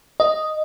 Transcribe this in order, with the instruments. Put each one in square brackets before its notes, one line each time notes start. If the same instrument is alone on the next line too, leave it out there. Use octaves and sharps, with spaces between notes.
[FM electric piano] D#5